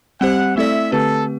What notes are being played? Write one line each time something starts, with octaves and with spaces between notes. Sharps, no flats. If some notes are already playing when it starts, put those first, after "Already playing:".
G3 C4 G4 C5 F#5
A3 C4 E4 A4 D5 E5
D3 A3 C4 G4 A4 B4